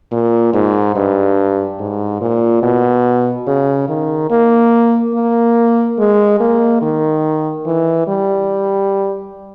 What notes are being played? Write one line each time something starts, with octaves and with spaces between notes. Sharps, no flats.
A#2
G#2
G2
G#2
A#2
B2
C#3
D#3
A#3
A#3
G#3
A#3
D#3
E3
G3